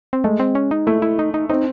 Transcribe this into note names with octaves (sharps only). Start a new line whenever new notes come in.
C4
G#3 A3
C4
C#4
D#4
A3 E4
E4
D#4
D#4
C4 D#4